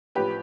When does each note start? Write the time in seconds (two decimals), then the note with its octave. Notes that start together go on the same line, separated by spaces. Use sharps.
0.15 A1 F3 G4 B4